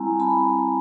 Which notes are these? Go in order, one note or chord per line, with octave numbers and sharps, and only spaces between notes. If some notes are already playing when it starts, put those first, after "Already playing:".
Already playing: G3 C4 E4 G#5 A#5
A5 B5